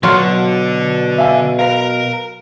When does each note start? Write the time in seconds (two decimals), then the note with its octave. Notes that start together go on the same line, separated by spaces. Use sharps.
0.03 B2 D3 F#3 F4 F#5
1.18 E5 F5 G#5
1.59 A#4 B4 F5 A#5